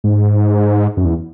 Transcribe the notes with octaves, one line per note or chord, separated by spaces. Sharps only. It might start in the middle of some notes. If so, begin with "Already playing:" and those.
G#2
F#2
E2